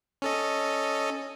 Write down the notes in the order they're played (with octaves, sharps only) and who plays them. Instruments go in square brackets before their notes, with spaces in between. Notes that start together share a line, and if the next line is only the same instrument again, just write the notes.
[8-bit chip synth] C#4 A4 D#5